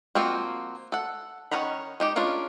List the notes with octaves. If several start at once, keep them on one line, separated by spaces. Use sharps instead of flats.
F3 A#3 C4 F4 F#4
A4 F#5
D#3 C#4 F#5 A#5 B5
G#3 D#4 G4
G#3 C#4 D4 F4 A#4